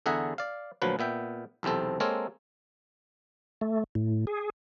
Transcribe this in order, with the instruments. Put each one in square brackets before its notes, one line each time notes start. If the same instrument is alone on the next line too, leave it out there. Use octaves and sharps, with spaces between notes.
[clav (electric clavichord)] E2 D3 G#4 E5 F#5 A#5
D5 F5
D2 A#2 F3 F#3 B4
A#2 B3 E5 G5
B1 E2 C3 C4 A4
G#3 A#3 C4 A4 A#4 C#5
[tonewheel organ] A3
A2
G#4